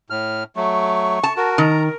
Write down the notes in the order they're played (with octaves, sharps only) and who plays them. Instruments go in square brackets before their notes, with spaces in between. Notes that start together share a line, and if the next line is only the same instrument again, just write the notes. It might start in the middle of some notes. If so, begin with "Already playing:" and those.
[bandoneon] A2 F6
[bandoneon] F#3 A3 [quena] C#6
[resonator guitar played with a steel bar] A5
[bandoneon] F#4 [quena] A#4
[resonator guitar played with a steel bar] D#3 [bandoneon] A#5